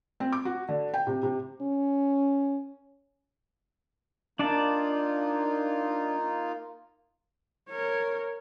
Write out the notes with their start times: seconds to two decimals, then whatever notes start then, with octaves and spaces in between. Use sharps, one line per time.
0.20 C4
0.32 D6
0.45 F#4
0.68 D3
0.94 G5
1.07 C3
1.23 C3
1.61 C#4
4.39 A#3 D4 D#4 F4 D5 A5
7.69 A#4 C#5